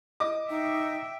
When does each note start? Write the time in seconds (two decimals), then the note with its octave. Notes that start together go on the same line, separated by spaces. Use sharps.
0.20 D#5 D6
0.50 D#4 E5 G5